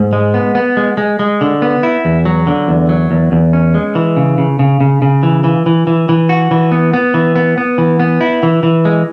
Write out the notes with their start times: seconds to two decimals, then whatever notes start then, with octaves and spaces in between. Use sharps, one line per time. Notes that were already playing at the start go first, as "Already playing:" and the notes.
Already playing: G#2
0.13 G#3
0.34 B3
0.55 B3
0.77 G#3
0.97 G#3
1.19 G#3
1.41 D3
1.62 B3
1.83 E4
2.05 E2
2.25 F#3
2.47 D3
2.68 E2
2.89 F#3
3.11 E2
3.32 E2
3.53 C#4
3.75 G#3
3.95 E3
4.17 C#3
4.38 C#3
4.59 C#3
4.81 C#3
5.02 C#3
5.23 E3
5.44 E3
5.66 E3
5.87 E3
6.09 E3
6.29 F#4
6.51 E3
6.72 B3
6.93 B3
7.14 E3
7.36 B3
7.58 B3
7.78 E3
8.00 B3
8.21 E4
8.43 E3
8.63 E3
8.85 G#3